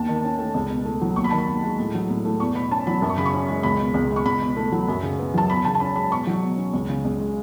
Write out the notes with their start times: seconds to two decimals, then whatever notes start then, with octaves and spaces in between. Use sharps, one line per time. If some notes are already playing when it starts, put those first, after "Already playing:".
Already playing: D#2 A5
0.08 D#3
0.24 C#4
0.39 A3
0.54 C#2
0.70 B2
0.85 A3
1.01 F#3
1.16 D#2 C#6
1.24 B5
1.30 D#3 A5
1.38 B5
1.48 D#2
1.63 G#3
1.79 A2
1.94 F#3
2.10 A2
2.25 A3
2.40 E2 C#6
2.55 B2 B5
2.71 C#4 A5
2.87 F#3 B5
3.02 F#2
3.09 C#6
3.17 C#3 B5
3.25 C#6
3.34 C#4
3.48 G#3
3.63 C#2 B5
3.79 B2
3.94 C#2
4.10 G#3
4.16 C#6
4.25 C#2 B5
4.41 B2
4.57 A3
4.72 F#3
4.88 F#2
5.02 C#3
5.19 B3
5.34 F#3 A5
5.50 E2 B5
5.65 C#3 A5
5.75 A5
5.80 C#4 B5
5.96 G#3 B5
6.11 B2 C#6
6.27 F#3
6.42 B2
6.57 C#4
6.73 C#2
6.89 C#3
7.05 C#2
7.20 G#3